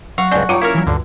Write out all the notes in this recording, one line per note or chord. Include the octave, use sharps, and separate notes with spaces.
F#3 F#4 F5
C#2 G2 C4 D5 G#5
G2 F#3 G3 D#4 F4 C#6 D6
A#3 C#4 E4 A#4 C#5
E3 F#3
D2 G2 D3